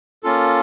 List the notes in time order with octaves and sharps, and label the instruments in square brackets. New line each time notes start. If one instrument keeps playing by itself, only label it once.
[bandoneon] A#3 C#4 F4 A4